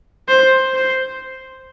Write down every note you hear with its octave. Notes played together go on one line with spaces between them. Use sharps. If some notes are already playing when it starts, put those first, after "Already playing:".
C5
C5